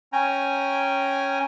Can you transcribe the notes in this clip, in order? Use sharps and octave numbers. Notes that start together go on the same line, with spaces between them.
C#4 G5 G#5 A#5